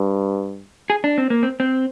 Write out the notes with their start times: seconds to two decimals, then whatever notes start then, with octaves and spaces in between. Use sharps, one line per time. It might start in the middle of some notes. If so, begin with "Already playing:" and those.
Already playing: G2
0.90 G#4
1.04 D4
1.18 C4
1.30 A#3
1.43 C4
1.60 C4